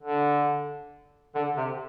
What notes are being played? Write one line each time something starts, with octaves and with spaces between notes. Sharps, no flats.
D3
D3
C3